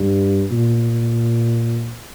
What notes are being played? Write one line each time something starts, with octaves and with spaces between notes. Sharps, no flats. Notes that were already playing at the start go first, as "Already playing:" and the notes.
Already playing: G2
A#2